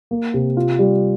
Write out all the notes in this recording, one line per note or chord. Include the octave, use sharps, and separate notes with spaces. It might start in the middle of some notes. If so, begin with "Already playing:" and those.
A#3
C3
F4
G3